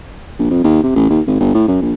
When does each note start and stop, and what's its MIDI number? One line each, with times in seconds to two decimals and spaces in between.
0.39 0.48 34
0.51 0.62 41
0.64 0.81 39
0.83 0.94 48
0.96 1.06 33
1.10 1.20 39
1.27 1.35 32
1.40 1.50 31
1.54 1.63 45
1.68 1.79 42
1.82 1.93 34